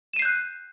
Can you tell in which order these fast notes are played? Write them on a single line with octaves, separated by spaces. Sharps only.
E7 D#7 C7 G6 F#6